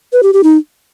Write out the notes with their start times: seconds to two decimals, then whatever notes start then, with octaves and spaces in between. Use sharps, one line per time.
0.13 B4
0.23 G4
0.33 G4
0.44 D#4